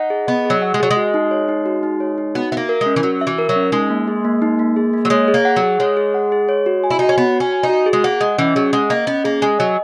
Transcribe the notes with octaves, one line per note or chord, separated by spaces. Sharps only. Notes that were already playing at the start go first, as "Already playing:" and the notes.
Already playing: D#4 F#5
G#4
B3 D#5
F#3 G#4
F#5
G#3
F#3 G#4
G#3
F#4
D#4
C#5
D#4
F#4
D#4
C#5
D#4
B3 F#4
B3 E5
A#3
A#4
G#3
C#4
E3
F#3 F#4
E5
E3
A#4
F#3
C#4
G#3 D#4
A#3
G#4
A#3
D#4
A#3
G#4
A#3
F#3
G#3 C#5
G#4
A#3
F#5
F#3
G#4
G#3 C#5
G#4
F#5
G#4
C#5
F#4
G#5
E4
D#4 F#4
C#4
B3 C#5
F#4
C#4
G#5
D#4
F#4
G#4
G#3
A#3 F#5
G#3 D#5
E3 C#4
F#3 G#4
G#3 F#5
A#3 D#5
B3 C#4
A#3 G#4
G#3 G#5
F#3 D#5